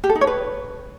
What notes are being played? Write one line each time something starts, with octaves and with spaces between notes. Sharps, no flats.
G4
A4
D#4
C#5
B4